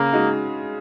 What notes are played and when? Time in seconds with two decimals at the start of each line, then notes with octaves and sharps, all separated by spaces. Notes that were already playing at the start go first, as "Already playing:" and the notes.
Already playing: C#3 A#3
0.13 G#3 D#4 F#4